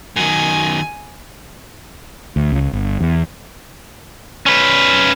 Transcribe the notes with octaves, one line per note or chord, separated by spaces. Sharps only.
F#2 D#3 G#5
D2
C#2
G1
E2
C#4 B4